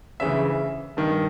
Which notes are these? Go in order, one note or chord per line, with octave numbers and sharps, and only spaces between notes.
D2 C#3 E3 E5
G2 D#3